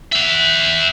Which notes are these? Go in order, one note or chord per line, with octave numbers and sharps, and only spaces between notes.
E5 F#5